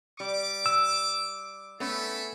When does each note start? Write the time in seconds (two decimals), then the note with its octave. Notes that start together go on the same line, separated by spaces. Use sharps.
0.20 G3 D6
0.66 E6
1.80 A3 B3 C#4 E4 A4